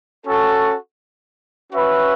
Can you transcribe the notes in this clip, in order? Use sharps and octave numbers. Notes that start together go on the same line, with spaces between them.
C#4 F#4 A4
C#4 F#4 B4 E5